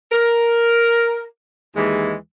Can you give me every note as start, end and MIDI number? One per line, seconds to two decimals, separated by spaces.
0.11 1.22 70
1.75 2.13 39
1.75 2.13 52
1.75 2.13 56